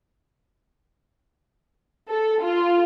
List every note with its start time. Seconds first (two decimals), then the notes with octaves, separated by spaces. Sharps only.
2.09 A4
2.42 F4